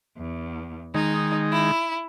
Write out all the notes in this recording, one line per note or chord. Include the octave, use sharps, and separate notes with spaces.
E2
D#3 G#3 D#4
E4